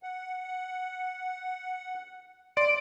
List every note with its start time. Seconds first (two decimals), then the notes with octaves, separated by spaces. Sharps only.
0.03 F#5
2.57 D5 C6 D7